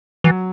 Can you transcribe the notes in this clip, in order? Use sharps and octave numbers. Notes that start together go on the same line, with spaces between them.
E3 F#3